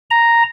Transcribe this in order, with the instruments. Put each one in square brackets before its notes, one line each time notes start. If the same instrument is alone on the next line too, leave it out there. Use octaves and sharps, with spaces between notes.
[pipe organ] A#5